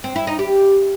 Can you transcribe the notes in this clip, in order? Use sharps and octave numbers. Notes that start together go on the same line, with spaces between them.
C4
E4
D#4
G4